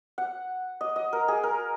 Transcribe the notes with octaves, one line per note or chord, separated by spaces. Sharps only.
F#5
D#5
D#5
A#4
G#4
A#4